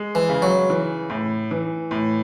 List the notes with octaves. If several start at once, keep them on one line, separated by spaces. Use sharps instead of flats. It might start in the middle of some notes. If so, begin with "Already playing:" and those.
Already playing: G#3
E3
C#3
F#3
E3
A2
E3
A2